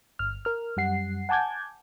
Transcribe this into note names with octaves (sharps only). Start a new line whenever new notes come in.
G1 F6
A#4 F6
F#2 G3 F#5 C7
F#5 G#5 A5 D6 G6 G#6